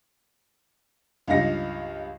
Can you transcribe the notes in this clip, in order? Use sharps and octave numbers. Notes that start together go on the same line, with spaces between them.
C#2 G2 D#4 F5 A#6 C#7